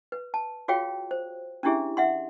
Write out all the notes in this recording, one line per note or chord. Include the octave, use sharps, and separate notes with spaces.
B4
A5
F4 F#4 G#4 C#5 F5 G5
C5
C#4 D4 E4 G4 G#4 E5
E5 F#5 C6